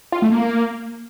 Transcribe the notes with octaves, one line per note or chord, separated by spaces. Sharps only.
F4
A3
A#3